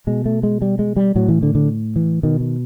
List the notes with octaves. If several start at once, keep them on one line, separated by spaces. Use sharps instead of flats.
B2 G#3
A3
G#3
G3
G#3
G3
A2 F#3
E3
D3
D3
E3
B2 D#3
D#3